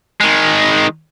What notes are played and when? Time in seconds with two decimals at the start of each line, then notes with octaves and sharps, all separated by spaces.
0.21 D#3 G#3